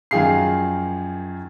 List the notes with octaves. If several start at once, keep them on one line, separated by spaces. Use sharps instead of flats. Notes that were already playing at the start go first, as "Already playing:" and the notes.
F#2 D#3 F3 G#4 F5 C7